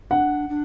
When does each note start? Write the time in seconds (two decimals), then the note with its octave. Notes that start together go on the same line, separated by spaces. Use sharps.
0.10 D4 F#5
0.49 D4